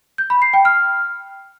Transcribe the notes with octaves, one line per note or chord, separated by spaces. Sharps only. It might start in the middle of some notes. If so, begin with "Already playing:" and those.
G6
B5
C7
G5
F6